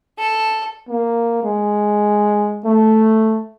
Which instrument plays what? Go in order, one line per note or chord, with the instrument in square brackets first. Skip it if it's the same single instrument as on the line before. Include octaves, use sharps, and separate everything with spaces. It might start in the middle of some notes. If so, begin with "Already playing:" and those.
[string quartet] A4
[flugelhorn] A#3
G#3
A3